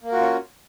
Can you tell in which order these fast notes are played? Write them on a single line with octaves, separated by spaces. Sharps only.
A#3 A#4 F#4 F4 C#4